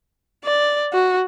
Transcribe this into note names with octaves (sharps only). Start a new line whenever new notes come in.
D5
F#4